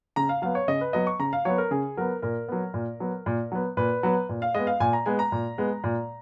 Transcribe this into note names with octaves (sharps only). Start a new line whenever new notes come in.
C#3 A#5
F5
F#3 B3 F5
C#5
C#3 D#5
B4
F#3 B3 D#5
C#6
C#3 A#5
F5
F#3 B3 C#5
A#4
C#3 G#4
F#3 B3 A#4
A#2 A#4
F#3 B3
A#2
F#3 B3
A#2
F#3 B3
A#2 B4
F#3 B3
A#2
F5
G#3 B3 D#5
F5
A#2 G#5
A#5
G#3 B3 G#5
A#5
A#2
G#3 B3
A#2